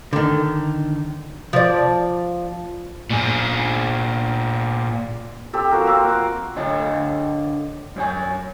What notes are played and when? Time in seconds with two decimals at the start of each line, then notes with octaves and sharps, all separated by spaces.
0.13 D3 D#3
1.53 F3 D5
3.10 A#2 G#4
5.53 C4 G4 A4
5.71 F3 F#4 A#4
5.86 A#3 C4 A#4
6.05 F#5 D6
6.56 D3 C#5 D#5 A5
7.96 F#2 C#5 G#5